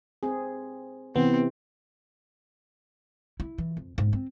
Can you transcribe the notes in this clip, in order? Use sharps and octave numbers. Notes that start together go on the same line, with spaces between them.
C4 G#4
C3 E3 B3 C4
E4
E3
F2
G#2
C4